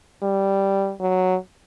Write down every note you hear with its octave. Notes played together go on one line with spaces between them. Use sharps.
G3
F#3